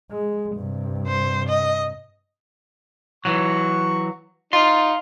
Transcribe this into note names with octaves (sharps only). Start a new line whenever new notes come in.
G#3
G2 C3
C5
D#5
E3 F#3 C#6
D#4 F5 C6